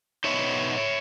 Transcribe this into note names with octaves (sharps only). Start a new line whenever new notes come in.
B2 F#3 B3 D#4 C#5 E5